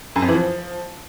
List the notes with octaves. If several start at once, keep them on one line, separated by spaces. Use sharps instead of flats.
F#2
F2
E3
F3